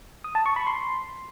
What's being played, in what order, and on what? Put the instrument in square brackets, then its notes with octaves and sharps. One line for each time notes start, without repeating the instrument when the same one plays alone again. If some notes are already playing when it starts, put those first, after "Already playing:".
[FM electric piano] D#6
A5
C#6
B5
C6